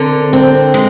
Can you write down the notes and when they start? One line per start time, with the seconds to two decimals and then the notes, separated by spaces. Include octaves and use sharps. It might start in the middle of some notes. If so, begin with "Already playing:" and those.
Already playing: D3 C4 A#4
0.33 C4
0.74 G#3